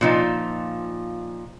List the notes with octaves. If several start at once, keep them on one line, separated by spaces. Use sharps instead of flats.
A#2 F3 D#4